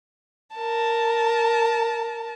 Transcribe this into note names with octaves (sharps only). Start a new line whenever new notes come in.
A#4 A5